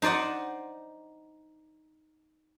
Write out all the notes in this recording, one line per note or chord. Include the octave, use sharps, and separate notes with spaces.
D#4 C5 D5 D#5 F#5